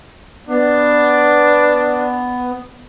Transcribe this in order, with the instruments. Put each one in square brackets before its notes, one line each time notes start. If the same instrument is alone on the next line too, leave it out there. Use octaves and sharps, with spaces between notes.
[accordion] B3 [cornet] D4